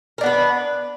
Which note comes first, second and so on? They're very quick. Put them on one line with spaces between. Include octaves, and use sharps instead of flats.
A#4 D4 B3 B4